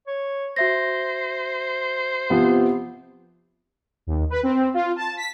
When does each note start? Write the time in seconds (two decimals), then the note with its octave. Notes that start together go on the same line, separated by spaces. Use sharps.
0.07 C#5
0.56 F#4 C5 E5 A#6
2.30 C3 F3 B3
4.07 D#2
4.30 B4
4.43 C4
4.74 F4
4.96 A5
5.17 B6